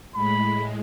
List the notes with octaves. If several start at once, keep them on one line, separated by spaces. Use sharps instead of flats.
A2 G#3 B5